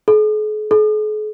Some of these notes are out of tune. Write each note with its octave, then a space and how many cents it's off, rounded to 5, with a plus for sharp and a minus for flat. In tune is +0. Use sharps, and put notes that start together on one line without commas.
G#4 +45
G#4 +45